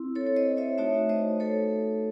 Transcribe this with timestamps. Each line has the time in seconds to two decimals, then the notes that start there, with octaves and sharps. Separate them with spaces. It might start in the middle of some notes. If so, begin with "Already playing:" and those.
Already playing: C4 E4
0.16 A4 C#5
0.27 C#5
0.36 C5 D#5
0.57 C#5 E5
0.78 A3 D#4 F#4 C#5 E5
1.09 C5 D#5
1.40 A4 C#5